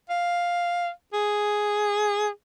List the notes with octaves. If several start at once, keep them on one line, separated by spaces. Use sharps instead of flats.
F5
G#4